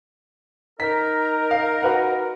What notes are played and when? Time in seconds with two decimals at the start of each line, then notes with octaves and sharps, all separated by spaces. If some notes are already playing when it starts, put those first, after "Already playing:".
0.80 D#4 A#4 B6
1.51 F5
1.82 F#4 B4 F#5